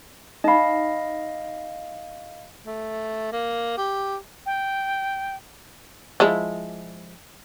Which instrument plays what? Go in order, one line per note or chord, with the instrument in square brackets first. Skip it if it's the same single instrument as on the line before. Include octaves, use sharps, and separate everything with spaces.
[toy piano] D#4 B5 [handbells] D#5 F5
[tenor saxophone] A3
A#3
G4
[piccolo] G5
[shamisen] F3 G#3 E4